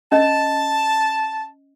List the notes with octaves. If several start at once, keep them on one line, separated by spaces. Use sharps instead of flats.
C#4 D#5 A5